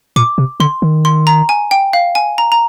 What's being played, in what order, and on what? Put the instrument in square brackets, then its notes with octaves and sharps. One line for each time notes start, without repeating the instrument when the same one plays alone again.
[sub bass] A#2 [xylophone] D6
[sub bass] C3
[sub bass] D3 [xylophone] C6
[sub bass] D#3
[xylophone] C6
A#5
G#5
G5
F5
G#5
A#5
A#5